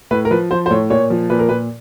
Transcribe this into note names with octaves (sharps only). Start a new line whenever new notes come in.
A2 B4
A#4
F3 B4
F3 C5
C5
A2 C#5
A#2 C#5
F3
A#2 B4
A#4
A#2 B4